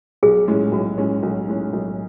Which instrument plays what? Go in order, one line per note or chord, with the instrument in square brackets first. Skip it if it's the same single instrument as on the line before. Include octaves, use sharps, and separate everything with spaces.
[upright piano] B1 [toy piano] G#4
[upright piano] A2 G#3 C#4
[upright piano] B1 [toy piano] F#4
[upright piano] A2 G#3 C#4
B1
A2 G#3 C#4
B1